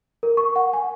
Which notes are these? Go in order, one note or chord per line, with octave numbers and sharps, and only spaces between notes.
A#4
C#6
F#5
G#5